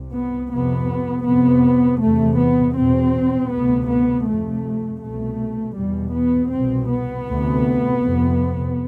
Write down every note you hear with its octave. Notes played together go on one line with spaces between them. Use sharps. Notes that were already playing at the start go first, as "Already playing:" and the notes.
Already playing: C2 C3
B3
F2 C3 B3
F2 C3 B3
E2 C3 A3
B3
E2 B2 C4
D2 C3 B3
B3
F2 C3 A3
C2 B2 A3
E2 B2 G3
B3
C2 B2 C4
B3
D2 C3
F2 C3